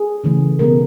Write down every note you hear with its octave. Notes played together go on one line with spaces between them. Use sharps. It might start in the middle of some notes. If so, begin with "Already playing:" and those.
Already playing: G#4
C#3 E3 A3
B2 G#3 B3 A#4